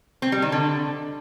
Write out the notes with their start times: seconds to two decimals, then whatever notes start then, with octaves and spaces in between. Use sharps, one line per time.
0.22 C4
0.32 G3
0.42 D#3
0.52 D3